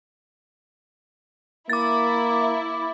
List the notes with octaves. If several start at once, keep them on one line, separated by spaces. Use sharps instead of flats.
A#3 E4 D6 A6